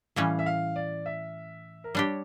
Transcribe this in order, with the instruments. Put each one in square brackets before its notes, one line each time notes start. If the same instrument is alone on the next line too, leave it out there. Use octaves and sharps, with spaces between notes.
[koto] A2 E3 G3 C#4 [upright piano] F5
[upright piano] E5
F5
D5
E5
A#4
[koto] G3 D4 G4 [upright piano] C#5